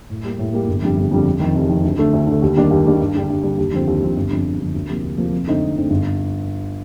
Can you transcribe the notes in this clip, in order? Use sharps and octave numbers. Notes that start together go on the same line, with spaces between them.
A2
G3 A#3
A2
G3 A#3
G1
F2 D3 G3
G1
F2 D3 G3
F1
F2 D#3
F1
F2 D#3
D2
D3 A3
D2
D3 A3
D#2
D#3 G3 A#3 D4
D#2
D#3 G3 A#3 D4
G2
D3 G3 D4
G2
D3 G3 D4
D#2
D3 F3 C4
D#2
D3 F3 C4
G1
F2 D3
G1
F2 D3
D2
C3 F3 A#3
D2
C3 F3 A#3
F2
D3 A3 C4 D#4
F2
D3 A3 C4 D#4
G1